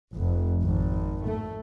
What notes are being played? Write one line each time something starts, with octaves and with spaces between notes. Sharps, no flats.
F1
G#1
A3